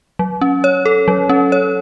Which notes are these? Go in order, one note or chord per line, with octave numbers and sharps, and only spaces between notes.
F#3
C#4
C#5
A4
F#3
C#4
C#5